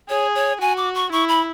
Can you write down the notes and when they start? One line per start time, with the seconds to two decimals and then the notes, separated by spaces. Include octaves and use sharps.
0.10 G#4 C#5
0.35 C#5
0.61 F#4 G#5
0.77 D6
0.95 C#6
1.12 E4 C#6
1.29 B5